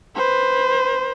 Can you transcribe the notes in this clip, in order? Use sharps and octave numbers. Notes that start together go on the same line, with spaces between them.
B4 C5